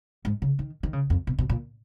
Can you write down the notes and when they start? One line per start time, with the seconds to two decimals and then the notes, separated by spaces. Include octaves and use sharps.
0.25 G#2
0.42 C#3
0.59 D#3
0.83 D#3
0.93 C#3
1.10 F2
1.27 B2
1.39 B2
1.50 A#2